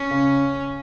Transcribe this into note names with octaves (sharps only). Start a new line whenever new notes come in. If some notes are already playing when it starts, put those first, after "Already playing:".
Already playing: C#4
C#3